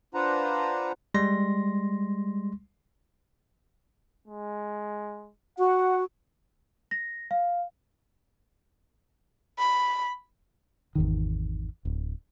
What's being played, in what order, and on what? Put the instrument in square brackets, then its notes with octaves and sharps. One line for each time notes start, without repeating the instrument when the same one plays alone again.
[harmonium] D4 F4 B4 C5 F#5 A#5
[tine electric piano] G3 G#3 C6 A#6
[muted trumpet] G#3
[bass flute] F#4 [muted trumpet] F#5
[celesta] A#6
F5
[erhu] B5
[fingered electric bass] G#1 E2 D#3
D1